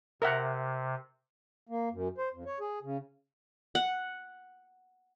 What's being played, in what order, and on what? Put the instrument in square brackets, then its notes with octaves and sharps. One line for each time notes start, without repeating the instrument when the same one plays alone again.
[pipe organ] C3 [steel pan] A#4 E5 F#5
[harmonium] A#3
F#2
C5
F2
C#5
G#4
C#3
[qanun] F#5